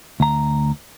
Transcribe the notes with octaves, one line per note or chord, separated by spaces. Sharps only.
D2 A#5